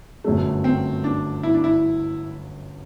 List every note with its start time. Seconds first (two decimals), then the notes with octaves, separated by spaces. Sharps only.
0.24 G1 F#2 F#3 A3
0.64 C4
1.04 D4
1.43 E4
1.54 D4
1.64 E4